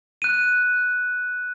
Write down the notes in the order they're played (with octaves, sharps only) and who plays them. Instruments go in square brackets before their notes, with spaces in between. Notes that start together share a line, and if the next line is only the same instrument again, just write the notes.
[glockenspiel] F#6 D#7